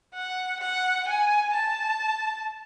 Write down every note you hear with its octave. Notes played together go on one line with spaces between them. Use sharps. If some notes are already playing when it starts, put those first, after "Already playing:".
F#5
F#5
G#5
A5